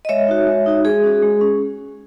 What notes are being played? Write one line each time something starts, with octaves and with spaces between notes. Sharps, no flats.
D#5
G#3 C#5 E5
D#4 F#4
G#3
D#4 F#4
G#3 G#4
C#4 F#4
G#3
C#4